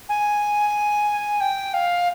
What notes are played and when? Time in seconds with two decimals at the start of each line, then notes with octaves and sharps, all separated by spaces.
0.09 G#5
1.41 G5
1.74 F5